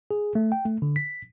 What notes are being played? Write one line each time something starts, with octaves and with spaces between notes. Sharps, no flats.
G#4
A3
G5
A3
D3
B6